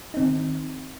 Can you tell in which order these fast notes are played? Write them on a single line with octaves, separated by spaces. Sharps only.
D#4 C4 D#3